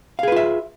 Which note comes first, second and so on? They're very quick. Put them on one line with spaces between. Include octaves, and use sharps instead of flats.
F5 G#4 B4 F4 E5